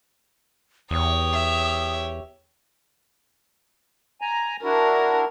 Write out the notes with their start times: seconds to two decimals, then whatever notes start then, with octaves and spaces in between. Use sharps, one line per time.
0.91 E2 G4 C#5 D#6
1.33 E5
4.21 G#5 A#5
4.63 D4 E4 F#4 A#4